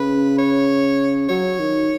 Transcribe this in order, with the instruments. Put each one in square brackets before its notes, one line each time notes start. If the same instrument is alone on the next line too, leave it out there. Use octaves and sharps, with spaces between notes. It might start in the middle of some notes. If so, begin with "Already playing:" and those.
Already playing: [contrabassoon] C#3 [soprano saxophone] B4
[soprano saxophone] C#5
[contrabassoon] F#3 [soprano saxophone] C#5
[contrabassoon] D#3